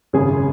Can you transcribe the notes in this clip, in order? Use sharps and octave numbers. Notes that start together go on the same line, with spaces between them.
G#1 F#2 C#3 G#4